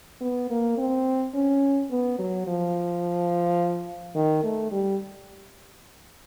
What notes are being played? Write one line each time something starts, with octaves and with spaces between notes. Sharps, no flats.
B3
A#3
C4
C#4
B3
F#3
F3
D#3
A3
G3